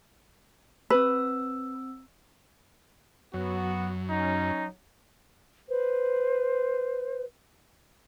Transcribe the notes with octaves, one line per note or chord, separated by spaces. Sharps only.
C4 B4 E6
F#2 F#3 B3 F#4
C#4 D#4
B4 C5